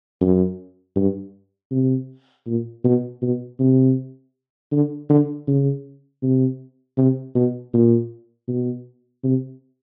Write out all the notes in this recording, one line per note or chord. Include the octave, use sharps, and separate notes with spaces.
F#2
G2
C3
A#2
B2
B2
C3
D3
D3
C#3
C3
C3
B2
A#2
B2
C3